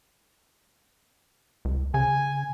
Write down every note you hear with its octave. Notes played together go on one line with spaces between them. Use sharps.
C#2
C#3 G#5